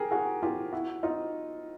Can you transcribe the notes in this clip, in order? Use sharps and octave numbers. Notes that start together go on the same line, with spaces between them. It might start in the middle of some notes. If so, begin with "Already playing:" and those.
Already playing: G4 G#4 A#4
F#4 G#4
F4 G4
E4 F#4
D#4 F4